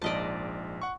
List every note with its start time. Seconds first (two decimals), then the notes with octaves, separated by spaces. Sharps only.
0.02 A#1 G#2 D5 D#5 A5
0.82 F#5 C#6